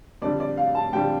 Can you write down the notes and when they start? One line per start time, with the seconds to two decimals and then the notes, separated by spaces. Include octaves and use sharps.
0.22 F2 D3 G3 D5
0.40 D5
0.57 F5
0.75 A5
0.93 F2 D3 G3 G5